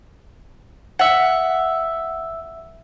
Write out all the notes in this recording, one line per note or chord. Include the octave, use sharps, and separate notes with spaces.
E5 F#5